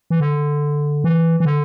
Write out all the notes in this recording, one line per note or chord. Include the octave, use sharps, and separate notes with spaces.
E3
D3
E3
E3
D3